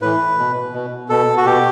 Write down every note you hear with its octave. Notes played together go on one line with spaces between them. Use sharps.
A2 E3 B4
B2
B2
B2 A4
F#4
B2 G4